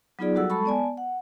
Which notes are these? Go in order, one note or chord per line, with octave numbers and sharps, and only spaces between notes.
F#3 B3 D#4 F4 G#4 D5
F#3 G3 F#4 A4 F#5 E6
G#3 A4 A5 B5 C#6
B3 D5 G#5 A5
F#5